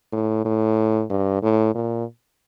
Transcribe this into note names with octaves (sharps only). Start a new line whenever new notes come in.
A2
A2
G2
A2
A#2